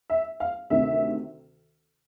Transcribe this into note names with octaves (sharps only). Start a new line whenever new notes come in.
E5
F5
D2 C3 D#3 E5